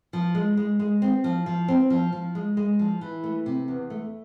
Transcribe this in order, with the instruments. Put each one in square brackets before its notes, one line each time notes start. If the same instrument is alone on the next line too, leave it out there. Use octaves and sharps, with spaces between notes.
[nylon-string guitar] F3
G#3
G#3
G#3
C4
F3
F3
C4
F3
F3
G#3
G#3
F3
E3
A3
C3
E2
A3